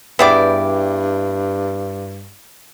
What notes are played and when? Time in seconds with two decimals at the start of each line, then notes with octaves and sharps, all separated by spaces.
0.19 G2 B3 E4 G#4 D5 G5 D6